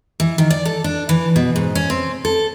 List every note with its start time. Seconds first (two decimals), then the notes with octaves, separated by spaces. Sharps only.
0.20 E3
0.38 D#3
0.50 D5
0.65 A4
0.84 D4
1.09 E3
1.36 B2
1.56 G#2
1.75 C#4
1.90 C4
2.25 A4